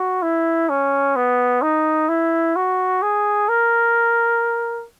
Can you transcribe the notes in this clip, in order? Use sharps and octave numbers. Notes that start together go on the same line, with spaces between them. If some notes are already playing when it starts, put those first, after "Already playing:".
Already playing: F#4
E4
C#4
B3
D#4
E4
F#4
G#4
A#4